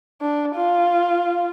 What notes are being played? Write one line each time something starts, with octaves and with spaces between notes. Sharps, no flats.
D4
F4